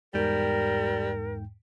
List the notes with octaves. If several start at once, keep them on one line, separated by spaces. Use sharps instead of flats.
E2 G#2 G3 A#4 G5